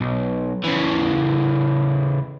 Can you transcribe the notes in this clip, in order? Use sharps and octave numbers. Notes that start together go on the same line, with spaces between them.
B1
C#3 E3